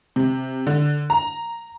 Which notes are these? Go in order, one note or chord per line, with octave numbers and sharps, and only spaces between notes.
C3
D3
A#5